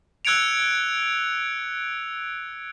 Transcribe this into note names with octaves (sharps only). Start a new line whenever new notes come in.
E6 F#6 G#6 C#7 D7 F7